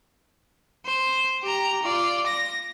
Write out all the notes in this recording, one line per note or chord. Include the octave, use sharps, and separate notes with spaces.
C5
G4 A#5
F4 D5
A#6